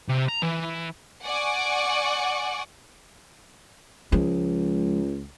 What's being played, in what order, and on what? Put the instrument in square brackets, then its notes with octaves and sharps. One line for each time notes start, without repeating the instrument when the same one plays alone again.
[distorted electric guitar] C3
A#5
E3
[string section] D5 F#5 G#5 C#6 D6
[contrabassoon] C#2 [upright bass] F3 G#3